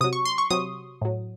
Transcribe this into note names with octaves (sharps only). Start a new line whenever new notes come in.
C3 F#3 D#6
C#6
C6
C#6
C3 F#3 D#6
A2 F#3